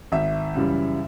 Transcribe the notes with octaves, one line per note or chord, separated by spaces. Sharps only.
G#1 E5
F#2 C#3 E3 G3